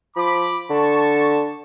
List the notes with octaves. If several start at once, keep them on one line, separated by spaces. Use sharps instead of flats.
F3 B5 D6
D3 A5 C#6